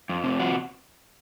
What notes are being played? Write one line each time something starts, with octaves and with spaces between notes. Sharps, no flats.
F2
C3
F3 F#4